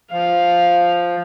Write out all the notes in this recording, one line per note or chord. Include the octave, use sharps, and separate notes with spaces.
F3 F5